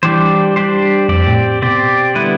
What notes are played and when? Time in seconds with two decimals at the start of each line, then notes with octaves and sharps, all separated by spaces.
0.03 E3 G3 D4 G4 C5
0.56 G3 D4 G4 C5
1.09 F2 C4 G4 D5
1.27 A2
1.62 B2 C4 G4 D5
2.15 D3 G3 B3 E4 B4